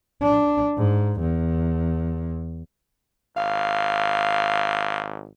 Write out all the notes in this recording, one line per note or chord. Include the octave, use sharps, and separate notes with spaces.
D4
G#2
E2
G#1 F5